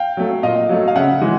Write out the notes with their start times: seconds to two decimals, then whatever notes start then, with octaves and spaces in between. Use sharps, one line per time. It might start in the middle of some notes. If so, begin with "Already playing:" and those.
Already playing: F5 G5
0.17 F#3 A3
0.43 A#2 D#5 F5
0.69 F#3 A3
0.88 F5
0.95 C#3 E5 F#5
1.21 E3 G#3